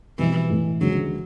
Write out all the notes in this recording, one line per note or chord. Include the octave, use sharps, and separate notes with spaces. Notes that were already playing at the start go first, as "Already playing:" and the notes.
B2 E3 G3 C4
A2 E3 A3
D2 C#3 F3 F#3 G#3